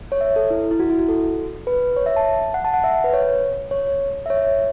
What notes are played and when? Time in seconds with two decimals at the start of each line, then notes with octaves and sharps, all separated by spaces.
0.12 C#5
0.21 E5
0.36 A4
0.50 E4
0.71 E4
0.80 F#4
0.90 E4
0.99 F#4
1.09 A4
1.67 B4
1.96 C#5
2.06 E5
2.16 A5
2.54 F#5
2.64 A5
2.74 F#5
2.84 E5
3.04 B4
3.13 C#5
3.71 C#5
4.26 E5
4.30 C#5